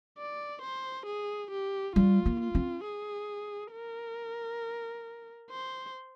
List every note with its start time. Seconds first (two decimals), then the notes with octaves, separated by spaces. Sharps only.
0.18 D5
0.62 C5
1.06 G#4
1.51 G4
1.96 G3 F4
2.26 A#3
2.40 F4
2.55 C4
2.84 G#4
3.73 A#4
5.50 C5